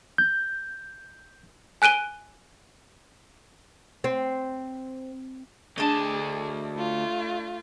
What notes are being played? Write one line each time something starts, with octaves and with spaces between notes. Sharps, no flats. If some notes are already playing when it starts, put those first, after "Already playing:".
G6
G#5 F#6 D7 D#7 G7
C4
D2 D4 G#4 D#5 A5
A3 F4